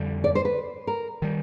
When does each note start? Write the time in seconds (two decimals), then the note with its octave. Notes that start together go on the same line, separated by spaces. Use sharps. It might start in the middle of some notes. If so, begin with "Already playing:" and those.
Already playing: F2 D3 G3
0.24 D5
0.35 C5
0.45 B4
0.87 A#4
1.22 D#3 G3